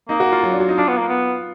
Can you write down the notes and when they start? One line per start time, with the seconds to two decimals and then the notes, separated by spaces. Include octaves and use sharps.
0.09 A#3 D#4
0.20 F#4
0.32 F4
0.43 F#3
0.51 D4
0.60 F#3
0.69 D#4
0.78 D4 F4
0.88 B3
0.98 A#3
1.09 B3